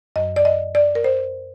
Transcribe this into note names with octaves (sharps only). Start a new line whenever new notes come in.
F#2 F#3 D#5
D5
D#5
D5
A#4
C5